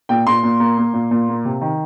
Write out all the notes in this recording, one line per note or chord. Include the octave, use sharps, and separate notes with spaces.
A#2 G5
A#2 C6
A#2
A#3
A#3
A#2
A#2
A#3
C3
D#3